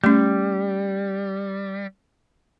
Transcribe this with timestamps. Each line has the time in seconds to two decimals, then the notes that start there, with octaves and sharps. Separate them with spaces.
0.04 G3 A3 C#4